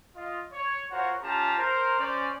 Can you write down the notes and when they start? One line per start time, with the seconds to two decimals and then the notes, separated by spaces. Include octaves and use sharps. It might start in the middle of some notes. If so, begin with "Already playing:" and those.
0.16 F4 D#5
0.52 C#5
0.91 F4 F#4 A#4 C5 C#5 F#5
1.21 C#4 F4 G4 A5 A#5
1.58 A#4 C5
1.99 C#4 C5 D5